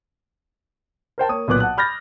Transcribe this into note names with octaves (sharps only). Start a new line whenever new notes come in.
A#4 C5 G5 A5
A#3 C#5 D#6
B1 A#2 B3 B4 D6 F#6
F#5 A5 F#6
B5 F6 G6 A6 A#6